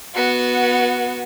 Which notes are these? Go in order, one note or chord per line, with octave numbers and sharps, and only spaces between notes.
B3 F#4